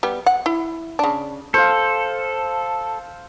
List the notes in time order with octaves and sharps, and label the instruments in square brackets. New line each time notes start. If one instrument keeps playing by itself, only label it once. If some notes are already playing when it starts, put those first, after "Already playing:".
[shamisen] G3 B3
F#5
E4
C#3 D4
[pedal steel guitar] A4 [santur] C5 F5